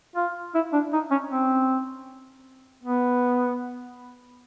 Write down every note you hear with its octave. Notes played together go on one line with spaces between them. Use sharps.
F4
E4
D4
D#4
C#4
C4
B3